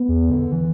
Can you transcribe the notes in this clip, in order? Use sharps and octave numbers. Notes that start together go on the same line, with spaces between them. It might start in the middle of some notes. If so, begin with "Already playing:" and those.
Already playing: B3
E2
D3
E3